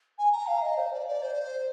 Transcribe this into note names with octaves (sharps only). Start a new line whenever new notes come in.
G#5
A#5
F5
D#5
C5
D5
D5
C5